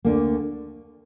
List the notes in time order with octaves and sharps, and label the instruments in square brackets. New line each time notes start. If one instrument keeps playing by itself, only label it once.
[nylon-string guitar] D2 D3 A#3